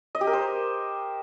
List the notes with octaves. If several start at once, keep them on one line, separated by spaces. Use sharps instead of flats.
D#5
G4
A#4
C5